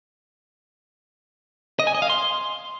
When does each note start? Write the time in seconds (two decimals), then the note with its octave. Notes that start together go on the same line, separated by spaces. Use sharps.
1.79 D#5
1.87 G#5
1.95 D#5
2.02 F5
2.10 C6